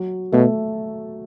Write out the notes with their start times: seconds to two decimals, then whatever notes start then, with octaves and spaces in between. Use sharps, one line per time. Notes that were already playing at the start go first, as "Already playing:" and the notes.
Already playing: F#3 F#4
0.32 B2 A3 A4